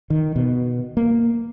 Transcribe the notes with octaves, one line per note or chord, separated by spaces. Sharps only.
D#3
B2
A#3